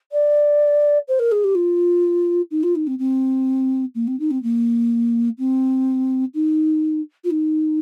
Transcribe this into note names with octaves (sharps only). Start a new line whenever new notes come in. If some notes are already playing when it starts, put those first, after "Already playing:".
D5
C5
A#4
G#4
G4
F4
D#4
F4
D#4
C4
C4
A#3
C4
D#4
C4
A#3
C4
D#4
F4
D#4